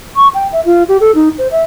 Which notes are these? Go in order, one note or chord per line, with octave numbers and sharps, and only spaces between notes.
C#6
G5
E5
F4
G4
A4
D#4
C5
E5